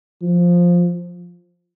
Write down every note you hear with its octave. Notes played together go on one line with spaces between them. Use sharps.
F3